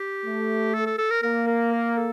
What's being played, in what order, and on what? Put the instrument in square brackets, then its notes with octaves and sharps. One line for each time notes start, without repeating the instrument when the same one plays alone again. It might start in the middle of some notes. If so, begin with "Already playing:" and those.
Already playing: [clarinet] G4
[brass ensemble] A3
[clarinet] A4
A4
A4
A#4
[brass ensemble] A#3 [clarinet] A#4
[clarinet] A#4
A#4
A4